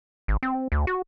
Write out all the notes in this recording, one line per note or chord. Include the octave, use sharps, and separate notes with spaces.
G#1
C4
D2
F#4